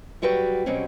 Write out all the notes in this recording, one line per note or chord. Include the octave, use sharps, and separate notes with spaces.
F#3 G3 F#4 B4 G5
B2 F#3 G3 C4 C#4